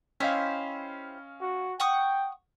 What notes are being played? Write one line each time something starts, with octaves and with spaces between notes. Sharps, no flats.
C#4 E4 G4 C5 D#5 F5
F#4
F#5 G5 C#6 D#6